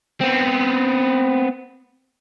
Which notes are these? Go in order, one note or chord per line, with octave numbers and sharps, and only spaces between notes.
B3 C4